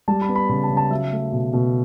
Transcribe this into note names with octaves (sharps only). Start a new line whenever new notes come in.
G3 A5
B5
B3
B5
C#3 B5
A5
C#3
A5
F#3 E5
A3
B2
B2